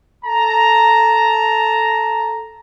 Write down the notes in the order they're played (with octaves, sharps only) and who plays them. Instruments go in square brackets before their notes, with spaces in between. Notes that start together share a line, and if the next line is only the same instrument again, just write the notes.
[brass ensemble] A4 A5 A#5